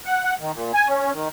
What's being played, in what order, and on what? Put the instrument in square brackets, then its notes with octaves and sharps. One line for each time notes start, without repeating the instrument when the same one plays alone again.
[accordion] F#5
F#5
D#3
A#2
G#5
C#4
D#3